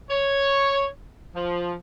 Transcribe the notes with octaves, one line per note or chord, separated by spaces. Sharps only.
C#5
F3